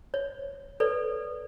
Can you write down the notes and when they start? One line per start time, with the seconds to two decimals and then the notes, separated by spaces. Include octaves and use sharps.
0.14 C#5
0.80 A4 B4 C#5 D5